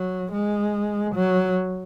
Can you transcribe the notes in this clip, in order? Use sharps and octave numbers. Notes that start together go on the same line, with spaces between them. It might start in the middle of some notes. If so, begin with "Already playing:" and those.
Already playing: F#3
G#3
F#3